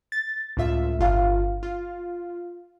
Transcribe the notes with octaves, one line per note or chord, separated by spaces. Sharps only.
A6
C#2 A2 F4 E5
G1 F4 F5
F4